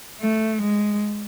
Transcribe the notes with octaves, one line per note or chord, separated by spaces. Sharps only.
A3
G#3